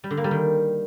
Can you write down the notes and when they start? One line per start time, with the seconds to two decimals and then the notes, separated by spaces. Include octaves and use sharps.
0.04 G3
0.10 D3
0.17 A#3
0.24 G3
0.31 D#3